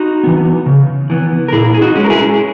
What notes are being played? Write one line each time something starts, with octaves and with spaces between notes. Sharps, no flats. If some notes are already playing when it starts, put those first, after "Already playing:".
Already playing: D#4 F#4
E3 B3
C#3
E3 B3
A#4
A#2 E4 G#4
G#4
D#4 F#4
G#3 C#4
A#4
E4 G#4